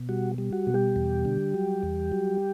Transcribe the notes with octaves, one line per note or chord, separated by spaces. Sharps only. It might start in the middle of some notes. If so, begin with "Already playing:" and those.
Already playing: B2
G3 F#4
G3
F#4
B2
G3 G4
E2
D3
F#3
E2
F#3